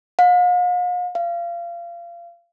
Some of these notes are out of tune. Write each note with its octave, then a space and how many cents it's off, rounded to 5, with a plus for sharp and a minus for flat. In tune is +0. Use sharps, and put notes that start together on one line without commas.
F5 +45
F5 -25